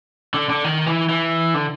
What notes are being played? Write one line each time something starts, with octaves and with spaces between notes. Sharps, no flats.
D3
D3
D#3
E3
E3
D3